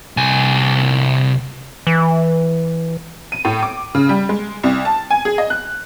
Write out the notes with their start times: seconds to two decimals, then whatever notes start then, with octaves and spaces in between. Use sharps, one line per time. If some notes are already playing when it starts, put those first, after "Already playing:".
0.17 C2 G#5
1.87 E3
3.32 D#7
3.45 A2
3.63 D6
3.95 C#3
4.09 G3
4.29 G#3
4.63 C2
4.85 A5
5.11 G#5
5.25 G#4
5.38 D#5
5.50 F#6